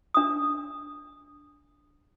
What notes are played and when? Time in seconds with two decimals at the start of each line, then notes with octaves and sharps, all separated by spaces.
0.14 D4 D#6